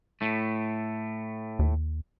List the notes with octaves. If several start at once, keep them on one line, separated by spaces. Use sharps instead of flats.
A2 A3
D#2